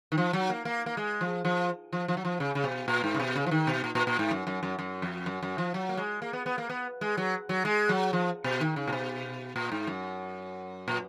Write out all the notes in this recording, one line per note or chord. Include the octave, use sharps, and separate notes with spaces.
D#3
F3
F#3
A#3
A#3
A#3
G#3
F3
F3
F3
F3
F#3
F3
C#3
C#3
B2
A#2
G#2
C#3
B2
C#3
F3
D#3
B2
A#2
A#2
A#2
G#2
F#2
F#2
F#2
F#2
F2
F#2
F#2
F3
F#3
A#3
G#3
A#3
B3
B3
A#3
B3
G#3
F#3
F#3
G#3
F#3
F3
B2
D#3
C#3
A#2
B2
A#2
G#2
F#2
A#2